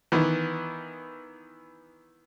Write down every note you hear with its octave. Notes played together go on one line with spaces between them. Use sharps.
D#3 E3 B3